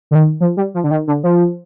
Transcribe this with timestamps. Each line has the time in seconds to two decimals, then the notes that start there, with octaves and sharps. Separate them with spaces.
0.11 D3
0.15 D#3
0.40 F3
0.57 G3
0.74 F3
0.84 D3
0.91 D#3
1.07 D3
1.23 F3